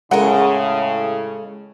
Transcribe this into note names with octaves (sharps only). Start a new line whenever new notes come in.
A2 C#3 G#3 A4 A#4 F#5